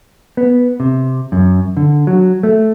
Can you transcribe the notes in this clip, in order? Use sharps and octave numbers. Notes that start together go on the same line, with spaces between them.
B3
C3
F#2
D3
F#3
A3